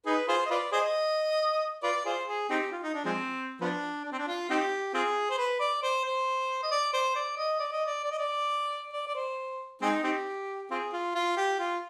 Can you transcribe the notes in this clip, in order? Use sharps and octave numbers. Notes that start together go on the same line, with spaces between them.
D#4 G#4 B4
F4 G#4 C5
D#5
F4 B4 D5
G#4 C5 D#5
F4 B4 D5
F4 G#4 C5
G#4
C4 D#4 G4
F4
D#4
D4
F3 G#3 C4
F3 B3 D4
D4
C4
D4
F4
C4 D#4 G4
C4 F4 G#4
C5
B4
D5
C5
C5
D#5
D5
C5
D5
D#5
D5
D#5
D5
D5
D#5
D5
D5
D5
C5
G#3 C4 D#4
C4 D#4 G4
C4 F4 G#4
F4
F4
G4
F4